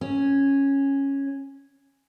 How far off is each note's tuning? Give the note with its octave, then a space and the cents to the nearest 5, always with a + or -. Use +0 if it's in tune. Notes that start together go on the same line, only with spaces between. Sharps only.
C#4 -10